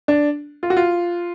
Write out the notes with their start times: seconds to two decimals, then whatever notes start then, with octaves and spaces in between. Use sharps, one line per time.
0.08 D4
0.63 F4
0.70 F#4
0.77 F4